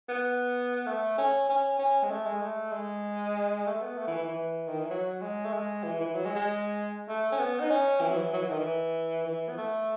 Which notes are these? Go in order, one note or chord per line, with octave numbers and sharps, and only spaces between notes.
B3
A3
C#4
C#4
C#4
G#3
A3
G#3
A3
G#3
A3
B3
A3
E3
E3
E3
D#3
E3
F#3
G#3
A3
G#3
E3
E3
F#3
G#3
G#3
A3
C#4
B3
D#4
C#4
E3
F#3
E3
F#3
E3
D#3
E3
E3
B3
A3